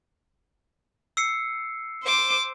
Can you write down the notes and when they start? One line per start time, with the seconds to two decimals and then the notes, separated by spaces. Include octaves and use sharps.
1.17 E6 C7 C#7
2.03 C5 D6